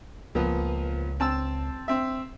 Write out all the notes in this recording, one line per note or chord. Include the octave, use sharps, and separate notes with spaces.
C#2 A#2 F3 B3
C4 A5 E6
C4 E5